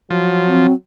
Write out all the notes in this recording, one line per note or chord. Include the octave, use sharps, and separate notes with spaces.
F3 F#3
C4